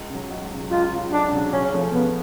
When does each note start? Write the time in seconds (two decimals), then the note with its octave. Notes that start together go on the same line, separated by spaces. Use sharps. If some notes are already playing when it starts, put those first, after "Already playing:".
Already playing: C#2
0.10 C#3 F#3
0.30 C#2
0.51 C#3 F#3
0.71 C#2 F4
0.92 C#3 F#3
1.12 C#2 D4
1.32 C#3 F#3
1.52 C#3 C#4
1.73 F3 A3 C#4
1.93 C#3 B3